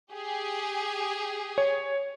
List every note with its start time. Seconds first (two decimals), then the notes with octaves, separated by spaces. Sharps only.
0.12 G4 G#4
1.58 C#5